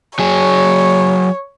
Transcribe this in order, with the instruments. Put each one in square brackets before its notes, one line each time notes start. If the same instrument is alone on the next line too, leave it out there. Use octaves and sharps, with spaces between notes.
[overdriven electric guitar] F#3 G#4 [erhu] C#5